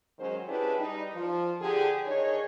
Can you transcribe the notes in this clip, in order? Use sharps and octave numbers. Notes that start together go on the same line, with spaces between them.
D#3 F#3 G#3 C#4 C5
C#4 D4 E4 G4 G#4 B4
G3 D#4
F3
D3 G4 G#4
D#3 D4 D#4 G#4 C#5